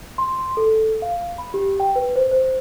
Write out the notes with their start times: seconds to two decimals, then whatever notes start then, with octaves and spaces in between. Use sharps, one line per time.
0.18 C6
0.57 A4
1.02 F5
1.38 B5
1.54 G4
1.80 G5
1.96 B4
2.16 C5
2.31 C5